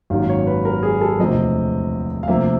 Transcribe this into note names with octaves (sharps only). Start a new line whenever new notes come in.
G#1 F#2 D#3 F#3 A#3 F5
C#5
B4
A#4
G#4
A4
E1 D2 C3 F3 D#5
F5
D2 C3 F3 A#3 E5